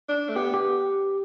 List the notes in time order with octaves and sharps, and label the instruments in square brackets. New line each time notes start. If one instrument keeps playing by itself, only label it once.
[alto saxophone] D4
A3
[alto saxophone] B3 [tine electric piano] G4
[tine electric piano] G4